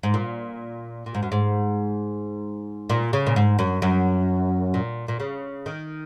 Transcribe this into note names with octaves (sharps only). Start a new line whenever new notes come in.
G#2
A#2
A#2
G#2
F#2
G#2
A#2
C#3
A#2
G#2
F#2
F#2
A#2
A#2
C#3
D#3